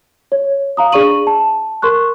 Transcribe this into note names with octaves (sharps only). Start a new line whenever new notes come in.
C#5
F5 A#5 D#6
D4 G#4 D5 C#6 D#7 F#7
A5
A#4 C6 C#6 F#6